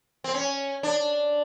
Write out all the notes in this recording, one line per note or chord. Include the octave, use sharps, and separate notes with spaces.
C4
C#4
D4